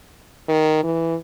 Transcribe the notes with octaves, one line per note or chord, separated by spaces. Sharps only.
D#3
E3